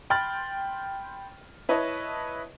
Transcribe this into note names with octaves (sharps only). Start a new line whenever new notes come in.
G5 B5 C6 F6 A6
E4 B4 C#5 D#5 A5